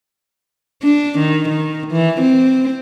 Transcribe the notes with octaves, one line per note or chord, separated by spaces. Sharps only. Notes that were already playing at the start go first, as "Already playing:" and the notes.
D4
D#3
D#3
E3
C4